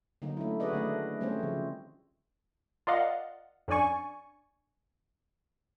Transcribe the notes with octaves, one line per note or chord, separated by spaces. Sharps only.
D3 F#3 A#3 D#4
A3 C#4 E4
F#4 G#4 B4 D5 D#5
D#3 A3 D4
G3 A3 C4 C#4 C5
C#3 F3
F4 A#4 D5 D#5 F5 F#5
F2 C#4 D4 D5 G#5 C#6